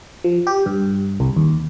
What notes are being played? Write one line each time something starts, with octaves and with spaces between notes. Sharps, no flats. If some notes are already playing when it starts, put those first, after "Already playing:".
F3
G4
G2
C2
D#2